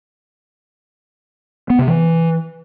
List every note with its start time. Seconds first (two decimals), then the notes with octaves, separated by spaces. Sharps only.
1.70 B3
1.79 C3
1.87 E3